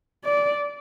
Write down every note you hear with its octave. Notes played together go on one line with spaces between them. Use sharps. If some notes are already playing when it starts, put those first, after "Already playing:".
D5